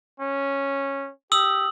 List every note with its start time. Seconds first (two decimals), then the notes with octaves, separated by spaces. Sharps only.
0.20 C#4
1.32 G4 D#6 E6 F#7